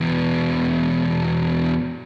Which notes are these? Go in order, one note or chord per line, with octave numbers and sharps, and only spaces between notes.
E2 B2